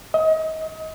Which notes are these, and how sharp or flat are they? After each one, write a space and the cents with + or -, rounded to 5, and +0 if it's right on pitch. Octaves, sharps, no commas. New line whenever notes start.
D#5 +30